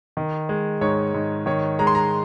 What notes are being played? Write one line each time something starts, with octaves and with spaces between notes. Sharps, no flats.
D#3
G#3
G#2 C#5
G#2
D#3 C#5
G#3 A#5
C6
A#5